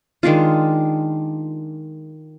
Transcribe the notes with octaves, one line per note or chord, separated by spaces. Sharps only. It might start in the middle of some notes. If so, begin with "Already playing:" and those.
D#3 G#3 D4 F4